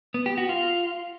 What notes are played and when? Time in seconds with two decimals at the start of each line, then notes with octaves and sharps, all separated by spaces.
0.14 B3
0.26 G4
0.38 F#4
0.49 F4